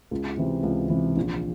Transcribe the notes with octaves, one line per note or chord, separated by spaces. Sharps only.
C#2
C3 E3
C#2
C3 E3
A#1